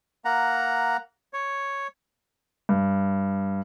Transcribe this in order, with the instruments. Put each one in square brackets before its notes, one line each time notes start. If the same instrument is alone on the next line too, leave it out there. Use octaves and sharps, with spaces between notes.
[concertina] A#3 F#5 A#5
C#5
[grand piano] G2